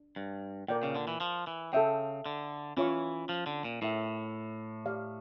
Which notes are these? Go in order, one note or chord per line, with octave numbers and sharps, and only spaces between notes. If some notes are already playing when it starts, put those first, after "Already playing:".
Already playing: D4
G2
A#2 A#4 D5 G5
C#3
D3
E3
F3
E3
C#3 A4 E5 G5
D3
E3 C#4 F4 C#5 F5 C#6
F3
D3
A#2
A2 E4 A#4 C#5 E5 G5
G4 D5 F5